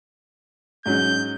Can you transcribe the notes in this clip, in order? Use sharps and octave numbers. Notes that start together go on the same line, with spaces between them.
G#2 F#3 C#4 G6